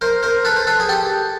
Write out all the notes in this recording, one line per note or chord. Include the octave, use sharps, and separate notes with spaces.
A#4 C5
A#4 C5
A4 B4
C5
A4 B4
G#4
G4 A4